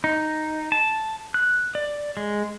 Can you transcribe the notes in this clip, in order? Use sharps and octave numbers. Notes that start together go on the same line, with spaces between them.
D#4
A5
F#6
D5
G#3